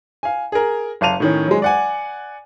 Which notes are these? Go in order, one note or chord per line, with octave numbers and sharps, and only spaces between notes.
F5 G#5
G#4 A#4
F#1 F5 A5 D#7 F7
A2 D#3 C#4
F#3 G#3
D5 F#5 G#5